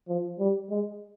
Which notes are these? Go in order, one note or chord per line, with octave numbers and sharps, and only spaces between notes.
F3
G3
G#3